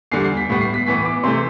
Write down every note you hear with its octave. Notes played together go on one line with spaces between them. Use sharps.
E2 D3 G3 C7
C7
B6
A2 G3 B3
C7
B6
A2 E3 B3 B6
D6
C3 E3 A3 C6